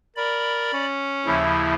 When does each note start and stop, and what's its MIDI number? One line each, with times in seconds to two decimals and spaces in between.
0.16 0.73 70
0.16 0.86 74
0.16 0.86 83
0.73 1.42 61
1.26 1.75 39
1.26 1.75 49
1.26 1.75 53
1.26 1.75 64